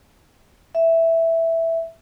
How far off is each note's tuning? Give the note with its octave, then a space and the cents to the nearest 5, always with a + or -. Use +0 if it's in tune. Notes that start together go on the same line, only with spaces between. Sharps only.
E5 +0